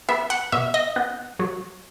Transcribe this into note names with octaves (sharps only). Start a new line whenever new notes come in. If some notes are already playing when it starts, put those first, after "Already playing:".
B3 E5
F#5
B2 E5
D#5
B3
F#3